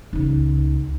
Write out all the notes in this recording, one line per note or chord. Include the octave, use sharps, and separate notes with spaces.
C#2 D#4